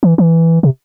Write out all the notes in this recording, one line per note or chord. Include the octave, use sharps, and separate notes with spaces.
E3
E3
C3